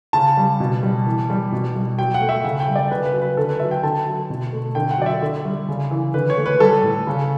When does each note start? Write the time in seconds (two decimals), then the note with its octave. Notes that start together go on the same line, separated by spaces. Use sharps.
0.13 C#3 A5
0.37 G3
0.60 B2
0.83 G3
1.06 E3
1.30 G3
1.52 B2
1.75 G3
1.98 F#3 G5
2.14 F#5
2.21 A3
2.29 E5
2.44 C#3 F#5
2.60 G5
2.68 G3
2.76 D5
2.91 C#3 B4
3.06 B4
3.13 F#3
3.22 B4
3.37 D3 A4
3.49 B4
3.60 F#3 E5
3.71 G5
3.83 D3 A5
4.06 F#3
4.30 B2
4.52 A3
4.75 D3 G5
4.91 F#5
4.98 F#3 D5
5.06 E5
5.22 D3
5.45 G3
5.68 C#3
5.91 E3
6.14 D3 B4
6.30 C#5
6.37 A3
6.46 B4
6.60 G3 A4
6.83 A2
7.07 C#3